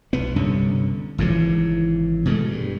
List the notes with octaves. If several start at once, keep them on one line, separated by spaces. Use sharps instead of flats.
B1 B3
C2 G2 D3 C#4
G#1 G#2 C#3 E3
B2 G#3 A3
G2